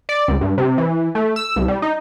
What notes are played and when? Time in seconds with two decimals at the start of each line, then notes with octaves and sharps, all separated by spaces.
0.09 D5
0.28 C#2
0.41 G2
0.58 C3
0.78 E3
1.15 A3
1.36 E6
1.56 C2
1.68 G3
1.82 D#4